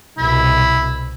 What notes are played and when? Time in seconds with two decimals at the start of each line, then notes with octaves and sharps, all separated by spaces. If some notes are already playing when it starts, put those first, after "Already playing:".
0.18 C2 B2 E4